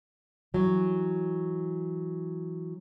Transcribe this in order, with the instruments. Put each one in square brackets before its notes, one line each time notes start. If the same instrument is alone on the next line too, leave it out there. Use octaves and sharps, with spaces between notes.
[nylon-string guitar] E3 F#3